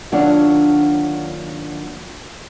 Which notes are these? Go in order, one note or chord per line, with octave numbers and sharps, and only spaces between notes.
D#2 F#3 D4 F4 C#5 F#5